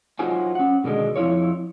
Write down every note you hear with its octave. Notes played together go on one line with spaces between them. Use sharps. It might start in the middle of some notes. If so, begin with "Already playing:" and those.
F#3 D#4 F4 F#4 C5 G#5
C#4 F#5
B2 D3 D#3 G#3
F2 D#3 E4 F4 C#5